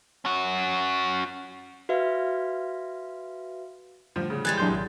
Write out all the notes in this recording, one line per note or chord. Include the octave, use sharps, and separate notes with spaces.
C#4 F#4
F#4 B4 E5 F5
A2 D3 F3 G3
C#3
E3 G3 G#3 F#6 G#6 A6
A#2 F#3 D4 E5 C6 G6
G#1